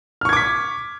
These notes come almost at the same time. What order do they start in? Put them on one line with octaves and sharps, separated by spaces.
F6 C#6 G#6 D6 B6